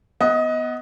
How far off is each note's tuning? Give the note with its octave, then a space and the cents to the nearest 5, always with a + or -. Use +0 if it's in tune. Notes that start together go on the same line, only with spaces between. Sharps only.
B3 +0 D#5 +20